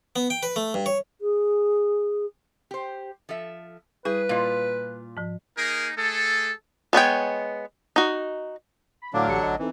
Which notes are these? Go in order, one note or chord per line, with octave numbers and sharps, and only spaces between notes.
B3
G5
B4
A3
G2
C#5
G#4
G4 C5
F3 A4 E5
G3 E4 G#4 B4
A#2 F4 D#5 F5
G#2 F3
A#3 D#4 G#4 A#4
A3 G#4 A4
G#3 B3 C#5 G5
D#4 F#4
B5
A2 D3 F#3 D4 F5 D6
A1 G4 C#7
A1 D#5
E3 C4 D#4 A4